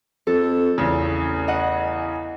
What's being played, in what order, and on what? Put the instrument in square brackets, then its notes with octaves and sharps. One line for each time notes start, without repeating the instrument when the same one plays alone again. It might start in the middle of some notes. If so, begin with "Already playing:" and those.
[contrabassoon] F2 [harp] A4
[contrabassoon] A1 [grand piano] E2 C#3
[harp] D#5 F#5